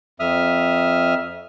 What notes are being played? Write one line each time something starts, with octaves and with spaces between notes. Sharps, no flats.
F2 E5 D#6 F6